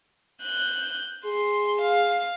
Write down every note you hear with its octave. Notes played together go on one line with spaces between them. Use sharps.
F#6 G6
G#4 C6
F5